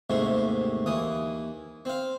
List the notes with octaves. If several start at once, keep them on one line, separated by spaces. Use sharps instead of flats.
D#2 G#2 C3 A3
D#2 E3 D#6
C4 F5